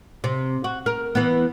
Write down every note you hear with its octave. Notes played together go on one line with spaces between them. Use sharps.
C3
F#4
A#4
E3 B3